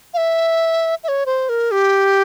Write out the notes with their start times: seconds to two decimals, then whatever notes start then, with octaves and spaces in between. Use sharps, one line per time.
0.14 F5
0.17 E5
1.04 E5
1.08 C#5
1.26 C5
1.49 A#4
1.71 G4